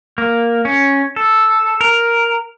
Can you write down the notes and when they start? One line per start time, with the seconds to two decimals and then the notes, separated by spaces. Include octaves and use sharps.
0.18 A#3
0.65 C#4
1.16 A4
1.81 A#4